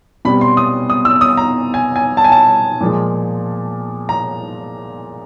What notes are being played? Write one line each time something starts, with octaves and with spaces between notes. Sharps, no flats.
B2 G3 C4 B5
C6
D#6
D#6
E6
D#6
A#5
G#5
G#5
A5
G#5
A5
A#2 F3 G#3
A#5